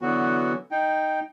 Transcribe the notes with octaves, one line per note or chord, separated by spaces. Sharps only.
D3 E3 F#3 B3 F#4
D#4 G5